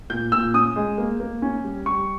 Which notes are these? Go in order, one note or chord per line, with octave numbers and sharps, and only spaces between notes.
A#2 G6
A#2 E6
C#4 D#6
G#3
A#3
A#3
C#4
G3
G3 C#6